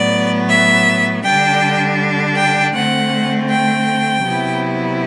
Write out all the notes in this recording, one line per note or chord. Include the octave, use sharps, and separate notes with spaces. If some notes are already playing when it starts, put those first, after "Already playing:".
Already playing: A2 F#3 B3 D5
E5
D3 G3 D4 G5
G5
D3 A3 C4 F#5
G5
C3 F#3 B3 E4